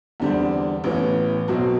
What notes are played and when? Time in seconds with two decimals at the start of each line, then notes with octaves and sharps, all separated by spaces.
0.20 E2 D3 G3 C4
0.84 A1 A2 E3 B3 E4
1.48 B1 B2 F#3 C4 F#4